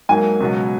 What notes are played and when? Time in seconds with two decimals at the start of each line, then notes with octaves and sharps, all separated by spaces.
0.09 G#2 F#3 A#3 G#5
0.40 C#2 B2 F#3